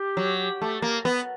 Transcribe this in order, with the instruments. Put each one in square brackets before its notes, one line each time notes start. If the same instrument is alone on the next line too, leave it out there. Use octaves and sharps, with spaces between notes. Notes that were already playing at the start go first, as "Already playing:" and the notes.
Already playing: [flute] G4
[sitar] F#3
A3
A#3
B3